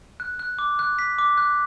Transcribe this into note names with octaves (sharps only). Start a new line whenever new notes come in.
F#6
F#6
D6
F#6
B6
D6
F#6